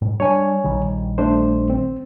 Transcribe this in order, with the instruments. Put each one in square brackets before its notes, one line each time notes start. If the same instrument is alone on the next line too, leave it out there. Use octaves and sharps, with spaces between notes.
[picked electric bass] G#2
[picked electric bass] G3 D4 [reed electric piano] C#5 G#5
[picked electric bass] A#1 D#3 G3
[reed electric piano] A3 D4 C5
C4